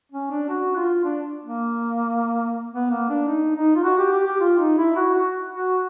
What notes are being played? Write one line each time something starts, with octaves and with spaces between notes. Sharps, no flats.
C#4
D4
F#4
F4
D4
A#3
B3
A#3
D4
D#4
D#4
F4
F#4
G4
G4
G4
F4
D#4
E4
F#4
F#4
F#4